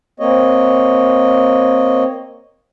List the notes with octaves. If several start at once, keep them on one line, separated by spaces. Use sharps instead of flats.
A#3 C4 C#5 D#5